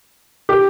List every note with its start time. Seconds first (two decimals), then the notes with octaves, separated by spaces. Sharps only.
0.49 G4